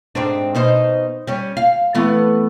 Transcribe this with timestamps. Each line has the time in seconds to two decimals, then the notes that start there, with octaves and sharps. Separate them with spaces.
0.15 G#2 C4 D4
0.55 B2 D#4 C5
1.27 G3 C#4
1.57 F5
1.94 E3 A3 B3